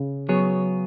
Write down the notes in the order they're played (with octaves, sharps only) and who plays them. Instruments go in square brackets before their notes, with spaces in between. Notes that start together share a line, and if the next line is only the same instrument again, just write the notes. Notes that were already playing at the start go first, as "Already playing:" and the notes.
Already playing: [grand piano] C#3
[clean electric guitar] F#3 B3 G#4 C#5